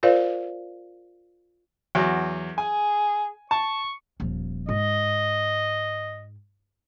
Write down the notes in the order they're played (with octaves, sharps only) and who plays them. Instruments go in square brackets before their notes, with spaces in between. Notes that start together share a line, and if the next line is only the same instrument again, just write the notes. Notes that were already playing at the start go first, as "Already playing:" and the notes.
[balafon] F4 A#4 C5 D5 F5
[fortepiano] E2 F#3
[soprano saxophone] G#4 [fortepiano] G#5
[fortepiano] A5 [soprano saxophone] C#6
[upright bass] D#1 F3
[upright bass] G#2 [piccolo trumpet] D#5